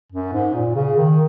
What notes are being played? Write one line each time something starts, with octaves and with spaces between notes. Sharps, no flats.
F#2
G#2
A#2
C#3
D#3